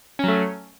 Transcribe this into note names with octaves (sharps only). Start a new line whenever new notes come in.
F#3 A3 C#4